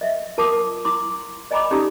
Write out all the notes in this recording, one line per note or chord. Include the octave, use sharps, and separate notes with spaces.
D#5 E5
F4 A#4 A5 C6 D6 D#6
E4 C6 D6
D5 D#5 G#5 A#5 B5 D6
C#4 D#4 G4 A4 A#5 D#6